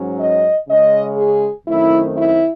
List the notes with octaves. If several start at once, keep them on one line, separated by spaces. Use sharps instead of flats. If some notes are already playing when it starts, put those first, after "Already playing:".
Already playing: G#2 F#3 C#4
D#5
C#3 G#3 C#4 D#5
G#4
F#2 D#3 A3 C4 E4
E4